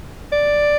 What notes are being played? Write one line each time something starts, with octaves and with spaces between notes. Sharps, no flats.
D5